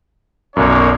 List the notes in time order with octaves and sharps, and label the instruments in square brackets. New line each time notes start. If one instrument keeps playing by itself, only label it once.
[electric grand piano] B1 F#2 [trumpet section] A#3 D4 C#5